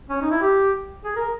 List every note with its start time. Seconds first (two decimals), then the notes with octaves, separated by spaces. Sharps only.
0.10 C#4
0.21 D#4
0.31 E4
0.42 G4
1.05 G#4
1.16 A#4